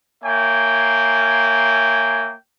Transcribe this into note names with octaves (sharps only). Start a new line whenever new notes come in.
A#3 C#5 E5 G5 G#5